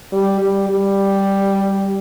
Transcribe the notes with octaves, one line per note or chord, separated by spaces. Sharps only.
G3
G3
G3